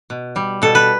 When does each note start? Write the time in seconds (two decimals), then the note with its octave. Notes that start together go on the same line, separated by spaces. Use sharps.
0.10 B2
0.36 G3
0.62 B2 A4
0.75 B4